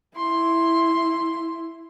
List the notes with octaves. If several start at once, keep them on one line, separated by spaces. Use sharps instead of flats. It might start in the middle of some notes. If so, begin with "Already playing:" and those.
E4 C6